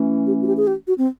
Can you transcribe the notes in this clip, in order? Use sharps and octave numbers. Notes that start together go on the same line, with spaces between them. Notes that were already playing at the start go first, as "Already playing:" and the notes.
Already playing: E3 A3 C#4
G4
F#4
G4
G#4
G4
F#4
C4